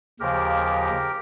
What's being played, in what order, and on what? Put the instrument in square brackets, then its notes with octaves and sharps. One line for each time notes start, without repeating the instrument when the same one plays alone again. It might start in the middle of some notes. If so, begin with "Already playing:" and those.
[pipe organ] D#2 C#3 F3 G4 A#4